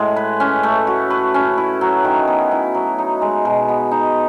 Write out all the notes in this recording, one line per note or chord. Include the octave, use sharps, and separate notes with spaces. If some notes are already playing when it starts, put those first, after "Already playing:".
Already playing: A2 G#3
B4
C#4
A3
F#4
B4
C#4
E4
F#3
D#3
B3
E4
F#3
D#4
G#3
B2
B3
D#4